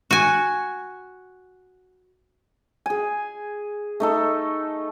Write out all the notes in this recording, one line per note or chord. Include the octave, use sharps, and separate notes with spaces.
F#4 G#5
G#4 G#5
A3 D#4 A4